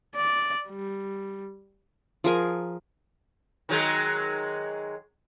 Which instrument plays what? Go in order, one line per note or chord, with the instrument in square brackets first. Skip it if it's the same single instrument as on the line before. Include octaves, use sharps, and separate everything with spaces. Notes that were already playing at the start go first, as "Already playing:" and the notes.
[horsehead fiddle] D5
G3
[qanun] F3 G#4 A#4 G#5
[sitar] D#3 F#3 G#3